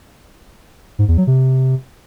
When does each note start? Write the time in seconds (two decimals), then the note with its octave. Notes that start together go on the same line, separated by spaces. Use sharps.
0.99 G#2
1.08 E2
1.18 F#3
1.27 C3